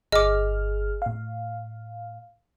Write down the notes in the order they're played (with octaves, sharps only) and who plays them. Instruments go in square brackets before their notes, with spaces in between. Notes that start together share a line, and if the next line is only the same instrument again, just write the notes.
[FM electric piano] G1 G#4 F6 [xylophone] D#5 D6
[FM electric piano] A2 F5